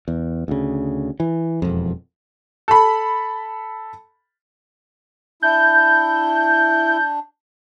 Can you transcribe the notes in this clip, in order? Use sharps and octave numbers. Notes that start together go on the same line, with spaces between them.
E2
D2 C#3
E3
E1 F2
A4 B5
D4 E4 G6